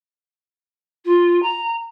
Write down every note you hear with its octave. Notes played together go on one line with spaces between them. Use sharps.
F4
A#5